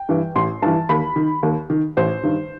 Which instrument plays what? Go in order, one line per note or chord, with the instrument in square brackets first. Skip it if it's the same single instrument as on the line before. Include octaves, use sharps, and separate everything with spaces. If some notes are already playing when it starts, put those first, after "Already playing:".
Already playing: [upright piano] G5
G2 E3
A1 C6
G2 E3 A5
D#2 B5
D#3
D#2
D#3
A1 C5
G2 D#3